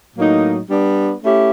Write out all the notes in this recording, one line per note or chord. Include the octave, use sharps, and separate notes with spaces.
A2 F#3 A#3 D#4
G3 B3 D4
A3 C#4 E4 G4